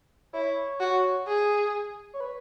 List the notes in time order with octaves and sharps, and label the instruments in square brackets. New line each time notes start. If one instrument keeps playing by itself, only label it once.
[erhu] E4 [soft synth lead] C#5
[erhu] F#4
G#4
[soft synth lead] C#5
B4